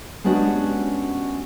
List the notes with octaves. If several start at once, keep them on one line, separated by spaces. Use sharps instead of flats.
G#3 B3 C#4 D4 F#4 G4